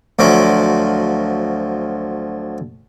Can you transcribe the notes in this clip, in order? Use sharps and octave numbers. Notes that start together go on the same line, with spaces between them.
D2 F3 F#3 D6